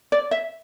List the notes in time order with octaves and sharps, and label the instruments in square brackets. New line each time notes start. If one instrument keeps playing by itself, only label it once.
[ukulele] D5
E5